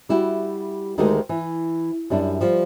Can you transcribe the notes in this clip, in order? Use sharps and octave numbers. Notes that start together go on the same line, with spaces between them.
G3 E4 F#4 G4
D2 D#3 G#3 A3 F#4 G4
E3
F#2 G3 D4 E4
F3 G3 F4